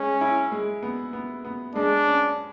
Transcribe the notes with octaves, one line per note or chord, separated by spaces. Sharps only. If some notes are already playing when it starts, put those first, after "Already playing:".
Already playing: G#3 C#4
E4
G#3
B3
B3
B3
G#3 D4
C#4